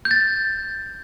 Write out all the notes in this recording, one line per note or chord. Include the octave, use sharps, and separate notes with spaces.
G6
A6